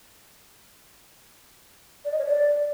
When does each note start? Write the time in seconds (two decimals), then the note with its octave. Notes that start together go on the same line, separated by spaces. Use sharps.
2.05 D5
2.12 D#5
2.19 C#5
2.25 D5